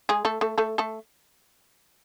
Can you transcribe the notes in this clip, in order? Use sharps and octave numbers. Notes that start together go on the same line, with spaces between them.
G#3 G#4
A3 A4
A3 A4
A3 A4
A3 A4